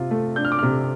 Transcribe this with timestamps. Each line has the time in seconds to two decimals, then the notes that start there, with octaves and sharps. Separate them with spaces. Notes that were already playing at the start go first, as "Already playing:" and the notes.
Already playing: C3 F4
0.11 A3
0.36 D4 G6
0.45 F6
0.52 D6
0.59 C3 F6